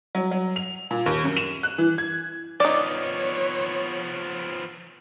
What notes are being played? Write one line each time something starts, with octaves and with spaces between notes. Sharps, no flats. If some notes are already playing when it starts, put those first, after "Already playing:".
F#3
F#3
F7
A#2
D#2
F#2
E7
F#6
E3
G#6
F3 B3 D#4 C#5 D5